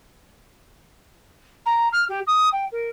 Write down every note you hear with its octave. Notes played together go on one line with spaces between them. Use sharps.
A#5
F6
G4
D#6
G5
A#4